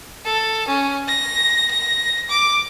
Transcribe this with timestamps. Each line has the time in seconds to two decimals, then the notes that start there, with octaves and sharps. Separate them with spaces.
0.25 A4
0.68 C#4
1.08 A#6
1.71 A#6
2.29 D6